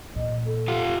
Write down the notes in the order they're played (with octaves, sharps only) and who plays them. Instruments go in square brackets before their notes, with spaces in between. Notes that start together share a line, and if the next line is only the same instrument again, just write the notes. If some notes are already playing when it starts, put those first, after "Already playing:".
[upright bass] A#2 [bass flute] D#5
[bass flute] A4
[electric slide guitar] F4 G4 F5